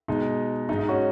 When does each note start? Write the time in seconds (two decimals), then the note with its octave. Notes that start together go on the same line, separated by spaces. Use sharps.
0.08 B2 G#3 D#4
0.69 G#3 D#4
0.72 G#2
0.79 D#4
0.88 C#4 F#4